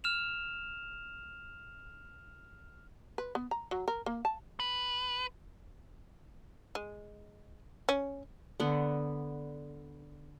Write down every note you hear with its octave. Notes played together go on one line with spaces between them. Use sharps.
F6 E7 F7
B4
B3
A#5
F#3
A#4
A#3
A5
B4
G#3
C#4
D3 B3